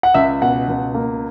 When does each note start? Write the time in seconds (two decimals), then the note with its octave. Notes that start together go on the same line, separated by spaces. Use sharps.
0.03 F#5
0.14 C#2 E5
0.42 B2 F#5
0.68 C#2
0.94 A#3